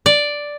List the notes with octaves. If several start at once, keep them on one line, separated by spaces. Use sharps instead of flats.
D5